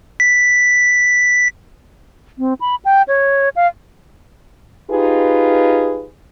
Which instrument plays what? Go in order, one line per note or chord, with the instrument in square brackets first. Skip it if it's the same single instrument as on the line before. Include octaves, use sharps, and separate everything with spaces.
[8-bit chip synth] B6
[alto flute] C4
B5
G5
C#5
F5
[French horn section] D#4 F4 G4 G#4 B4